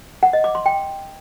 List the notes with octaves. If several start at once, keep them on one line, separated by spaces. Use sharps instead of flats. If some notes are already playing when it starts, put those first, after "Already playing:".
F#5
D#5
D6
C6
G5